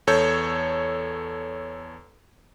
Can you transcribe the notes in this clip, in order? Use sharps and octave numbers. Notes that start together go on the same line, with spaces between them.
E2 A4 C#5 G6